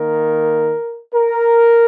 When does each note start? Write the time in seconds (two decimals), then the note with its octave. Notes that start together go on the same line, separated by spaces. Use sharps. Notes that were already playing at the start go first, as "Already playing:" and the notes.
Already playing: D#3 A#3 A#4
1.13 A#4